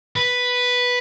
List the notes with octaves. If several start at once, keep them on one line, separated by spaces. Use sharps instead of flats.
B4